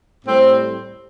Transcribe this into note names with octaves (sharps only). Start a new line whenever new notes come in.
A2 G3 C4